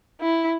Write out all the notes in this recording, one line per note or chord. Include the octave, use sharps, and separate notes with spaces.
E4